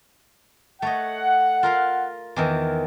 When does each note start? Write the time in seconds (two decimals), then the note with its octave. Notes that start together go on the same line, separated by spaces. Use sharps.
0.82 A3 C#5 D#5 F#5
1.63 F4 A#4 F5
2.36 E2 D#3 E3